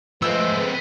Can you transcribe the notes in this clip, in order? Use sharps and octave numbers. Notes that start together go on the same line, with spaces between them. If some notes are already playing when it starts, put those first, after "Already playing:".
F3 G#3 A3 B3 C4 B4 E6